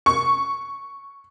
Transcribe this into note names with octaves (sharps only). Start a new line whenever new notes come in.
C#6